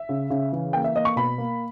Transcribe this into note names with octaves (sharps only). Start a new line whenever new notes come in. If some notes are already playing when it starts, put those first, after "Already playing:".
Already playing: E5
C#3
C#3
E3
A#3 G5
E5
A#3 D#5
C#6
B2 B5
A#3